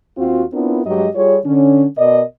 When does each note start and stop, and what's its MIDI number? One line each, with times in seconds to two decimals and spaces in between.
0.18 0.43 39
0.18 0.43 60
0.18 0.43 65
0.18 0.43 66
0.53 0.81 59
0.53 0.81 60
0.53 0.81 62
0.53 0.81 64
0.53 0.81 65
0.53 0.81 70
0.86 1.08 43
0.86 1.08 54
0.86 1.08 56
0.86 1.08 67
0.86 1.08 75
1.15 1.38 55
1.15 1.38 65
1.15 1.38 68
1.15 1.38 73
1.45 1.85 50
1.45 1.85 61
1.98 2.23 47
1.98 2.23 70
1.98 2.23 74
1.98 2.23 75